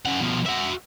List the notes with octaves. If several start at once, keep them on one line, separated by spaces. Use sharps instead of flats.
C#3 F#5
B2 F3
F#4 E5